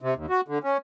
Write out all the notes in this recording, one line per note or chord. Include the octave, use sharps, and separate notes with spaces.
C3
D#2
F#4
D3
C#4